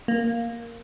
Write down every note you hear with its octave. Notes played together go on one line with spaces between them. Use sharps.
A#3